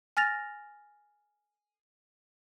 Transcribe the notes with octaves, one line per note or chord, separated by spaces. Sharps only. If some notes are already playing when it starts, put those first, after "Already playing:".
G#5 F6 A6 A#6 F7